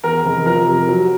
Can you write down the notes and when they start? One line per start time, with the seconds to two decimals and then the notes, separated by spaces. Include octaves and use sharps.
0.04 E2 A#4
0.25 F1
0.45 F3 A#4
0.67 C3
0.88 F#3